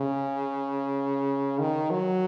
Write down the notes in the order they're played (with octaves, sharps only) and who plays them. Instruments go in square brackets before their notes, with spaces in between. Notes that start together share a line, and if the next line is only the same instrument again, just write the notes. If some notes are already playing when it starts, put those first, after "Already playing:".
Already playing: [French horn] C#3
D#3
F#3